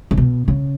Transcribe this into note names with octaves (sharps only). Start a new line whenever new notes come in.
C#3
B2
C#3